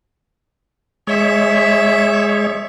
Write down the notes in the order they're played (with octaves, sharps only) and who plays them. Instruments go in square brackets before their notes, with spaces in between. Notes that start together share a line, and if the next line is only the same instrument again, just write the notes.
[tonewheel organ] G#3 C#5 [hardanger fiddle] E5